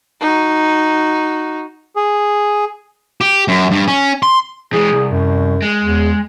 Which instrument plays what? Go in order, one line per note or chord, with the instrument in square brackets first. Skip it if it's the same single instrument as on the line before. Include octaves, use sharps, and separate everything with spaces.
[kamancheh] D#4 F#4
[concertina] G#4
[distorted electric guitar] G4
F#2
G2
C#4
C6
[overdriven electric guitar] E3 G#3 [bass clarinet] G#4
[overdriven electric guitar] C2
[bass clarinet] F#2
[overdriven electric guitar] G#3
[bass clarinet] E2